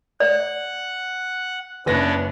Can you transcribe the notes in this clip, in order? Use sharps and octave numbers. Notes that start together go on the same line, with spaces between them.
D5 F#5
F#1 B3 C#4 D4 B4 A#6